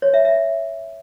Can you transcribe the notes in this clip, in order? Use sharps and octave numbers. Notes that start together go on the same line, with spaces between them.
C#5
E5
E5